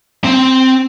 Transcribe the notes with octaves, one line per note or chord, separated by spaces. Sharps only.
C4